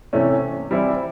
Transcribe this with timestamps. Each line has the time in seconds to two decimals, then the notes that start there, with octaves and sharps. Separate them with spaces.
0.13 C3 E3 A3 C#4
0.71 E3 G3 C4 E4